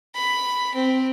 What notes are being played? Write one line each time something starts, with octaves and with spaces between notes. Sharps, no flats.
B5
C4